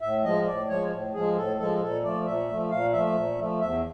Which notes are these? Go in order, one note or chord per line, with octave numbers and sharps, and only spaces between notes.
A2 E5
F3 G#3 D#5
A2 D5
F3 G#3 C#5
A2
F3 G#3 G#4
A2 A4
F3 G#3 A4
A#2 A4
F3 A3 D5
A#2 E5
F3 A3
A#2 F5
F3 A3 E5
A#2
F3 A3
E2 E5